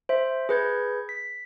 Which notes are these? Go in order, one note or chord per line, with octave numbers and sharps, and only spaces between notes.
C5 E5
G#4 B4 G6 G#6
B6